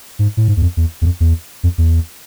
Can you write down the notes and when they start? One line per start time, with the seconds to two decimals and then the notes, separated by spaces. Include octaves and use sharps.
0.19 G#2
0.37 A2
0.48 G#2
0.57 E2
0.62 F2
0.77 E2
1.01 E2
1.05 F2
1.20 E2
1.63 F2
1.78 E2